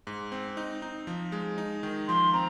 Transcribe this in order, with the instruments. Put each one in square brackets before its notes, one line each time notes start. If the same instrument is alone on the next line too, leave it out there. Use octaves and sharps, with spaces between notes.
[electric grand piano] G#2
C4
D#4
D#4
F3
G#3
D#4
D#3
[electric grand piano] F3 [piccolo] C6
[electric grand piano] C4 [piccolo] A#5